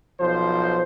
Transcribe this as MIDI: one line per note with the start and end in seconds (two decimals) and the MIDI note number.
0.20 0.83 35
0.20 0.83 53
0.20 0.83 72